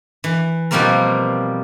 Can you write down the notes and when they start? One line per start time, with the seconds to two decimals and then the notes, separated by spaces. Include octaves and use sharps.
0.24 E3
0.71 B2 F3 G3 A#3 C4 A#4